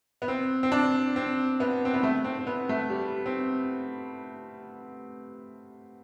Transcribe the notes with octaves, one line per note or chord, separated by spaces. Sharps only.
B3
C4
C4
D4
C4
B3
C4
B3
A3
C4
C4
B3
A3
G3
C4